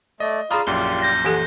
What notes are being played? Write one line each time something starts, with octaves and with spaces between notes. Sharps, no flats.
A3 D5 D#5
F4 G#4 D5 F5 A#5 B5 D#6 F6
A#1 F#2 F4 G4 D5 G7
G6 A#6
E3 G4 A4 F#5 G#5